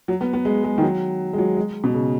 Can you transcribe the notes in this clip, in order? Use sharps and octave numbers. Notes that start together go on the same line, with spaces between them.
F#3
B3
B3
G#3
G#3
D#3
F#3
G#3
F#3
G#3
B2
C#3